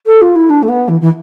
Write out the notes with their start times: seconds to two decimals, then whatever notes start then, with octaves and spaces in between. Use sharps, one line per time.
0.06 A4
0.21 F4
0.35 E4
0.49 D4
0.62 A3
0.68 B3
0.88 E3
1.01 E3